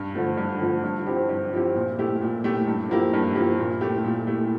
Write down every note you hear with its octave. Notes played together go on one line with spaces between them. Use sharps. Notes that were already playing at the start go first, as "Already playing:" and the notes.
Already playing: G2
D3 F3 A3
G2
D3 F3 A3
G2
F3 C4 E4 G4
G2
F3 C4 E4 G4
A#2
A3 E4 G4
A#2
A3 E4 G4
G2
F3 A#3 E4 G4
G2
F3 A#3 E4 G4
A#2
A3 E4 G4
A#2
A3 E4 G4